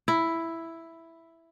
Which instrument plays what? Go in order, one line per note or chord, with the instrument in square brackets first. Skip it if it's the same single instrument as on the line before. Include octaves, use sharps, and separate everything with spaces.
[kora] E4